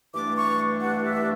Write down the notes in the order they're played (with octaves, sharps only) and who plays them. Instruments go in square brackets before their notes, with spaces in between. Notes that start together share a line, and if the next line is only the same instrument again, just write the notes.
[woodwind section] G2 E3 A3 D4 D6
C#6
F#5
E5